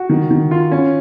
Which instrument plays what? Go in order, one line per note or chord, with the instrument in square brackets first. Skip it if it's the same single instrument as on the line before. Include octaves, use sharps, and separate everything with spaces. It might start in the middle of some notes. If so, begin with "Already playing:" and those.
Already playing: [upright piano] F#4
D#3
D#3
F4
C#4